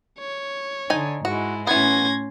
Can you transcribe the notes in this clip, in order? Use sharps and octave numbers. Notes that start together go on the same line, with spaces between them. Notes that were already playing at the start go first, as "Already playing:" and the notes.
C#5
D3 D#4 G#5
G#2 G#3 E4 F#4
A2 E3 B3 C#4 C6 G#6 A#6